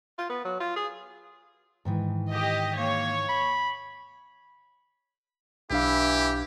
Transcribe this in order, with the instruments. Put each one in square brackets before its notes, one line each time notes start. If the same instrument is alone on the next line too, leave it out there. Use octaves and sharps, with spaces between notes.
[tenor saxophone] F4
B3
F#3
F4
G#4
[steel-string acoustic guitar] G#2 D#3 E3
[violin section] G4 D#5
[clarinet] A#3 [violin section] C#5
[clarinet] B5
[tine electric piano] B1 D4 F5 [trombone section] E3 E4 [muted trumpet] G4